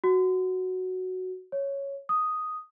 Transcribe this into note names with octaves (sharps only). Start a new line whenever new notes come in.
F#4
C#5
D#6